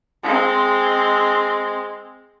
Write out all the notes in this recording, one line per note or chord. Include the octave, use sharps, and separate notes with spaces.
G#3 C4